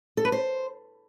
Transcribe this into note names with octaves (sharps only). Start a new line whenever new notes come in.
A4
B4
C5